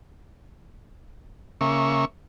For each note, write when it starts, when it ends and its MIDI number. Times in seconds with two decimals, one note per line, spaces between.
1.61 2.05 49
1.61 2.05 58
1.61 2.05 76
1.61 2.05 85